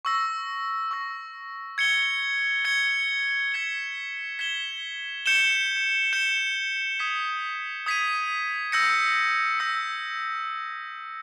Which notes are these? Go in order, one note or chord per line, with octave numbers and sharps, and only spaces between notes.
C#6 E6 A#6
C#6 E6 A#6
G#6 C#7 G7
G#6 C#7 G7
G#6 B6 E7 G7
G#6 B6 E7 G7
G6 C#7 E7 G7
G6 C#7 E7 G7
D#6 G#6 B6 D#7
D#6 G#6 B6 D#7
E6 G6 A#6 C#7
E6 G6 A#6 C#7